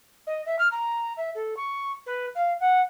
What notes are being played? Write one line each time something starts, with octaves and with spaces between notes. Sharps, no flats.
D#5
E5
F6
A#5
E5
A4
C#6
B4
F5
F#5